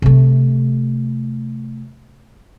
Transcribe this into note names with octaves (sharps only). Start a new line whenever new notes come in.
C3 A3